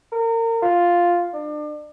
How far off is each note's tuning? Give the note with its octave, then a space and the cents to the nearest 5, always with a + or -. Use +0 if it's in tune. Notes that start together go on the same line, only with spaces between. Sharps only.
A#4 -30
F4 +0
D4 +35